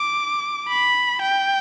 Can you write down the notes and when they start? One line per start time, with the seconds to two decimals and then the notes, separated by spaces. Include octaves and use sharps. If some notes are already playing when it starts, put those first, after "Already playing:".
Already playing: D6
0.68 B5
1.22 G5